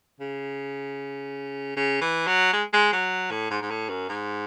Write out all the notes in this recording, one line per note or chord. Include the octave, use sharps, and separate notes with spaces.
C#3
C#3
E3
F#3
G#3
G#3
F#3
A2
G#2
G#2
A2
F#2
G#2